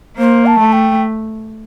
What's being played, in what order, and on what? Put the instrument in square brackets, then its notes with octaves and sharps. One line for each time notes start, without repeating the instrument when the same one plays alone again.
[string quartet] A#3 [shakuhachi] C5
[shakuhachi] A5
[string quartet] A3
[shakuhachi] G5